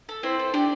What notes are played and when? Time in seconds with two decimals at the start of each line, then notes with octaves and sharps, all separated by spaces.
0.09 A4
0.23 C4 E4 C5
0.39 A4
0.54 D4 G4 D5